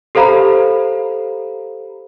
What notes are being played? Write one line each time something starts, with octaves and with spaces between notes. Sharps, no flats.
G4 A4 C5 F5 A#5 B5